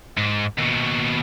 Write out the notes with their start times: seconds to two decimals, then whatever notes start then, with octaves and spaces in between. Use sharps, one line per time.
0.17 G#2
0.59 D#2 B2